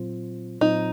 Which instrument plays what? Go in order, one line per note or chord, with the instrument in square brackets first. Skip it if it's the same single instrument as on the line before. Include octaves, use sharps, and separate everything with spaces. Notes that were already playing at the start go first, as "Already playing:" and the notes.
Already playing: [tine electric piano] A#2 F#3 C4 F4 C5
[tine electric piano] A#2 F#3 C4 F4 C5 [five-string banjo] D#4